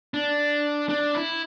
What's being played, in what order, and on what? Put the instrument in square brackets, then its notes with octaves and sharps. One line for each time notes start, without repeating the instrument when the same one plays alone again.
[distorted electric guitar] D4
D4
E4